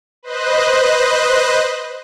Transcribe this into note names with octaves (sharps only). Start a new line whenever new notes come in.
B4 C5 D#5 F#6